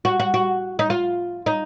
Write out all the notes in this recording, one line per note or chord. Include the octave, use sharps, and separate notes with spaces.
F#4
F#4
F#4
D#4
F4
D#4